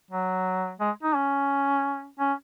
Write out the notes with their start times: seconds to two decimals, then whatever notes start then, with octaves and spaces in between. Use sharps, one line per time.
0.11 F#3
0.80 G#3
1.03 D#4
1.15 C#4
2.19 C#4